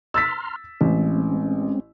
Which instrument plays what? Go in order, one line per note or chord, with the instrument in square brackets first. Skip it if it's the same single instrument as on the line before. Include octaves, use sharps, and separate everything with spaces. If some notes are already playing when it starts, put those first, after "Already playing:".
[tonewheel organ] A#5 C6 F6 [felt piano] E6 A6 B6
[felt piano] A1 [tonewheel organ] G#3 C4 C#4